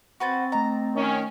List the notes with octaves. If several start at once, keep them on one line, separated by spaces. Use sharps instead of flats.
C4 F#4 B4 C5 C#6 A6
A3 D#5 A#5
D#3 C#4